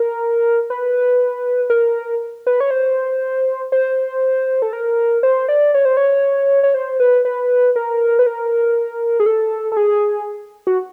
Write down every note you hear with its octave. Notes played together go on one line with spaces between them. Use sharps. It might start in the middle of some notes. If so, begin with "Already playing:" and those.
Already playing: A#4
B4
A#4
B4
C#5
C5
C5
A4
A#4
C5
D5
C#5
C5
C#5
C#5
C5
B4
B4
A#4
B4
A#4
G#4
A4
A4
G#4
F#4